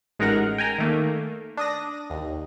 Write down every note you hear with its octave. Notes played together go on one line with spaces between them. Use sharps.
A1 G#3 D#4 A#4 F#5 A#6
G5 G#5 A#5
D#3 A3 A#3
D4 D#6 A#6
D#2